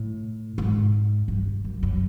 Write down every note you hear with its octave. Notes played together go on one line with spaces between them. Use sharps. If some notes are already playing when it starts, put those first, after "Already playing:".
Already playing: A2
G#2
G2
F#2
F#2